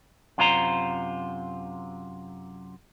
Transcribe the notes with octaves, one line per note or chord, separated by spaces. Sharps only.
F#2 C3 F4 C5 A#5